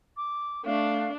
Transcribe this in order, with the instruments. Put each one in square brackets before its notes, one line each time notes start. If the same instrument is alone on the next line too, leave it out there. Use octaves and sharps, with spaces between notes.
[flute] D6
[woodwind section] A3 [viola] D4 [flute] F5